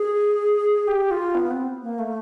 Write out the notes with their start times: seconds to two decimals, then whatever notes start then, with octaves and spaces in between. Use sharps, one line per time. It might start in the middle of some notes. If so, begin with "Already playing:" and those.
Already playing: G#4
0.87 G4
1.11 F4
1.35 B3
1.50 C4
1.82 A#3
1.99 A3